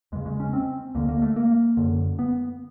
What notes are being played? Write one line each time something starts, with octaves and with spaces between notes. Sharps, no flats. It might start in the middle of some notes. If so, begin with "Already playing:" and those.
E2 C#3 G#3
G#3
C#4
C4
D2 D3 A#3
A#3
A3
A#3
F#2 D3
B3